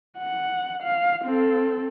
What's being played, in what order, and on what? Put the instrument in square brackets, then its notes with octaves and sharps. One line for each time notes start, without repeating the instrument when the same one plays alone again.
[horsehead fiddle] F#5
F5
C4 A4